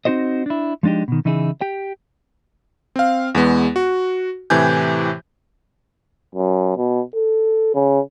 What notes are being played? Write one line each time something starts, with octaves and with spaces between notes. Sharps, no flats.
C4 D#4 F#4 C5 D#5
D4 E4
F3 G#3 D4 D#4 G4
B2 D#3
C#3 E3 D#4 E4 G4 G#4
G4 G5
C4 F5
E2 G#3 B3
F#4
A2 C3 E3 G4 G#5 G6
F#2
B2
A4
C#3